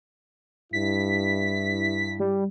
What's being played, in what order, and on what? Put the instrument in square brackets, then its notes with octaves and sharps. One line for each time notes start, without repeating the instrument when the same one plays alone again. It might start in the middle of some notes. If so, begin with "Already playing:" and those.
[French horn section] G2 E4 [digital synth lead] B6
[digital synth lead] G3